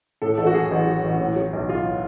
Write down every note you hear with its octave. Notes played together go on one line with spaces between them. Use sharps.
A2 A4
A1 A4
F#4
F#3 G#4
A1
F#3
A1
A2
F#3
B1
F#3 F4